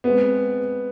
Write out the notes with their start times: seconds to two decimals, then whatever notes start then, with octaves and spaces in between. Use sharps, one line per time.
0.04 G#3 B3 C4 G#4 B4